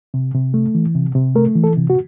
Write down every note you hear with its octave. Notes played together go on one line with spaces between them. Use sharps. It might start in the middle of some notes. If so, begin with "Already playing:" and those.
C3
C3
A3
E3
C3
C3
A3 A#4
E3
A4
C3
F#4